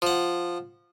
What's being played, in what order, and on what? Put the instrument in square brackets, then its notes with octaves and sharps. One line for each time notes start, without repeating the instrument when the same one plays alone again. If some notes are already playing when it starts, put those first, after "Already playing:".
[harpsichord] F3 F#5